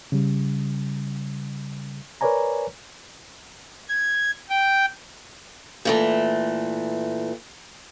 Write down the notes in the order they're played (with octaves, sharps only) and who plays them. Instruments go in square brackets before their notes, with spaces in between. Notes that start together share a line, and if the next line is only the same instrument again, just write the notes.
[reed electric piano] C#3 G3
A#4 B4 C#5 D5 G#5 A#5
[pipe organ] G#6
G5
[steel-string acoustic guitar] A#2 E3 A3